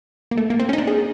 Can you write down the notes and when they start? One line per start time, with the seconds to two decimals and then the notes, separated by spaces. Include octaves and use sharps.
0.31 A#3
0.37 A3
0.50 A#3
0.60 C4
0.69 C#4 D#4
0.78 D4
0.87 G#4